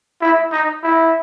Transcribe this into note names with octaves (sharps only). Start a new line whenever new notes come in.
E4
D#4
E4